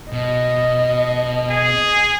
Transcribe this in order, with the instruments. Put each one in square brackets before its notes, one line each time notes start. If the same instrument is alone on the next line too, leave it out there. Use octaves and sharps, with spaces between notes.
[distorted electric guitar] B2 [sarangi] D#5
[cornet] G#4